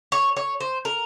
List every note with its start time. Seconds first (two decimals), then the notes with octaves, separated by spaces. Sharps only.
0.12 C#5
0.36 C#5
0.60 C5
0.85 A#4